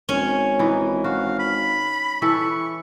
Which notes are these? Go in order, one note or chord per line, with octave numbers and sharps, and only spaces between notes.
G#1 C#4
E3 D#4
F#4 F5
B5
E3 A4 C#6